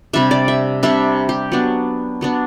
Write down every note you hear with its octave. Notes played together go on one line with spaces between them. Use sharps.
C3 G3 D4 E5
D5
E5
C3 G3 D4 E5
G4
F#3 B3 D4
F#3 B3 D4